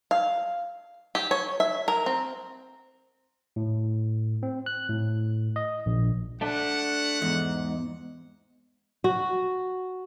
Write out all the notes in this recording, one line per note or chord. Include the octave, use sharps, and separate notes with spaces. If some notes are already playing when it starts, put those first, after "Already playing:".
F5
G4
C#5
E5
A#4
C4
A2
C4
F#6
A2
D#5
A#1
A3 D4 F#5
E2 G#2
F#4